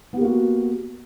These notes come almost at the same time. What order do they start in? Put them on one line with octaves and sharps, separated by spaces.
B3 G4 A#3 F#4